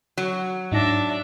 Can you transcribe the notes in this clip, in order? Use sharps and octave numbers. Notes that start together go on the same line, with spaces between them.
F#3
G#2 D4 D#4 E5 A#6